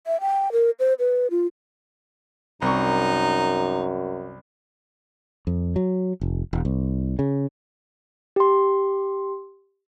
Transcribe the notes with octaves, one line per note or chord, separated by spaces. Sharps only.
E5
G5
A#4
C5
B4
F4
C2 F#2 D#4 C#6
F2
F#3
F1
E1
C2
C#3
G4 C6